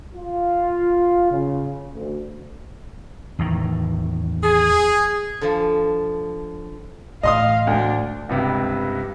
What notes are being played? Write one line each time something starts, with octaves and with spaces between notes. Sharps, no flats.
F4
C#3
D2
E2 A2 D#3
G#4
D3 F3
A2 E3 D#5 F5 C6 D#6
D2 D4
C#2 G2 C3